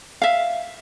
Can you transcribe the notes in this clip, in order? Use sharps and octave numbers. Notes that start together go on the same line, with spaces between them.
E5 F5